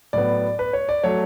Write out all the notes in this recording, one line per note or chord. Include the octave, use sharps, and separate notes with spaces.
A2 F#3 B3 D5
B4
C#5
D5
F#3 A3 C#5